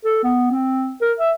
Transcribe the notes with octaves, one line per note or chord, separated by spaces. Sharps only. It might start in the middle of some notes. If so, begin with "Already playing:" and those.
A4
B3
C4
A#4
E5